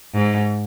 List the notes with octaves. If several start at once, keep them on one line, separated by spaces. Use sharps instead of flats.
G#2